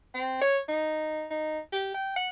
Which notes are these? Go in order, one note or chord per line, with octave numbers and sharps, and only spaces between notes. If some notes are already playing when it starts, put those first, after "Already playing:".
C4
C#5
D#4
D#4
G4
G5
F#5